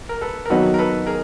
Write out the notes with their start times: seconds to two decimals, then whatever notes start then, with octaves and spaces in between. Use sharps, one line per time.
0.09 A#4
0.21 A4 B4
0.46 A#4
0.50 D#3 F#3 B3 D#4 F#4 A4 B4
0.74 A#4
0.78 A4 B4
1.07 G#4 A#4